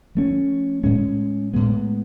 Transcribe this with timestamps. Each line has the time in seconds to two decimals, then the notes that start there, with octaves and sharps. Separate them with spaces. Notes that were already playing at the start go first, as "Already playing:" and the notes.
0.15 F3 A3 C#4
0.84 A2 G#3 C#4
1.53 A2 G#3 B3